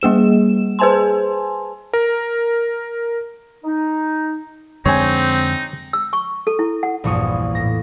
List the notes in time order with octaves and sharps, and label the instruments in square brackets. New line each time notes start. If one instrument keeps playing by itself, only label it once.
[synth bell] G3 A#3 G#4 E7
G#4 B4 C5 G#5 A5 C6
[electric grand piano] A#4
[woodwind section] D#4
[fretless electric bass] F2 D3 G#3 [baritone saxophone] C4 [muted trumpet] D#4 [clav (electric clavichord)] C#5 G#5
[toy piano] E6
C#6
A4
E4
F#5
[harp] A#1 E2 G2 C#6 D#6
A2 A#6